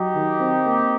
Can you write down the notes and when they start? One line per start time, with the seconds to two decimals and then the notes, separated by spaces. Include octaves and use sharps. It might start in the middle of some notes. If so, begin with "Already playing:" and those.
Already playing: F#3 D#4 G4
0.14 D#3
0.40 C4
0.66 A#3